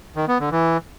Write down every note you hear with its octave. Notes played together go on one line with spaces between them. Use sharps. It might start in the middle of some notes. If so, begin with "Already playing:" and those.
D#3
B3
D3
E3